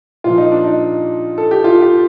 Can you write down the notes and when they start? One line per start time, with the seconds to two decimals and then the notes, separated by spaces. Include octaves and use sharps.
0.24 A#2 F3 A#3 F4
0.38 D#4
0.52 D4
0.64 D#4
1.38 A4
1.51 G4
1.64 F4
1.81 G4